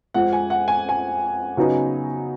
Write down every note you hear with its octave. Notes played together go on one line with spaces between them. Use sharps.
F2 F3 G#3 F#5
G#5
F#5
G#5
G#5
C#3 F#3 B3 D#4